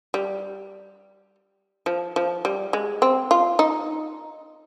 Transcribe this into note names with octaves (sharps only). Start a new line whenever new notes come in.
G3
F3
F3
G3
G#3
C4
F4
D#4